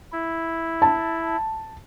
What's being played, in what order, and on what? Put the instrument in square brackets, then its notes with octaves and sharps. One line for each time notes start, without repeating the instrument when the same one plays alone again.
[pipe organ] E4
[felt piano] A5